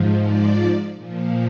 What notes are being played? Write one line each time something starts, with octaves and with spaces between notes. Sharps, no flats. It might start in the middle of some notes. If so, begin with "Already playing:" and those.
Already playing: G#2 F3
D5
A#2 F3